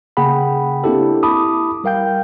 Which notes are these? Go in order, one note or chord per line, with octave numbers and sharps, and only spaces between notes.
C#3 A#3 G#4 F#5 G5 B5
A#3 C4 D4 E4 G4 A4
E4 A5 B5 D6 D#6
G3 A#4 F5 G5 G6